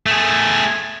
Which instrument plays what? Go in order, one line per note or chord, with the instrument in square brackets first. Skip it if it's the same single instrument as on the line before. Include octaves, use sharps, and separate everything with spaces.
[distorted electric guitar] A3 G#4